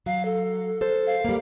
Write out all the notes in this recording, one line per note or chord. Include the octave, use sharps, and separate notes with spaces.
F#3 F5
A4
A4 C5
F5
G3 A#3